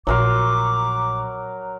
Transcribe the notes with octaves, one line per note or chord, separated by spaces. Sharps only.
A#1 F#3 A#4 C6 D6